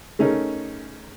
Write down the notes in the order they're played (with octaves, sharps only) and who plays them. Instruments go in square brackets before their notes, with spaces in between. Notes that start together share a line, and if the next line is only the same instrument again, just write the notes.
[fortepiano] A3 C#4 D#4 G#4 A#4